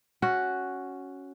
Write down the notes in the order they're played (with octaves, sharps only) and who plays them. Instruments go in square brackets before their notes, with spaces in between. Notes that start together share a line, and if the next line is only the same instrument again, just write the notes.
[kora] C#4 F#4